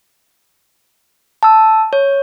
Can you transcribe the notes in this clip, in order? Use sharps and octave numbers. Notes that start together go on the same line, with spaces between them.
A5 E6
C#5